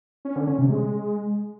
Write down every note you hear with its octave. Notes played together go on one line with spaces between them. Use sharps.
C#4
D3
C#4
C3
G#3